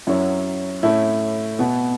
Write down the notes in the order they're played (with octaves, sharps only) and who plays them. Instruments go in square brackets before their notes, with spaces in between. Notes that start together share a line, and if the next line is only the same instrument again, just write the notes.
[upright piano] F#2 F#3 C#4 E4
A2 A3 C#4 E4
B2 B3